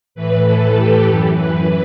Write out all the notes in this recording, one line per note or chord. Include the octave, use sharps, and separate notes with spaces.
A2 E3 B4
A4
G4
F#2 E3
B4